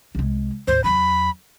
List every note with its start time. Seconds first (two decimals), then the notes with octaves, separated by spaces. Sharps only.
0.15 C2 G#3
0.67 D#2 A2 C5
0.84 E2 F#3 B5